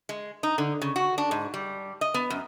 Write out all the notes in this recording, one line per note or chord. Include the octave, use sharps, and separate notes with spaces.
G#3
D#4
D3
C#3
F#4
D4
G#2
G3
D#5
B3
F#2